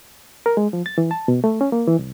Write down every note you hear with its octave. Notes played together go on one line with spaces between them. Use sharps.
A#4
G#3
F3
A6
E3
A5
B2
A3
C#4
A#3
E3
C2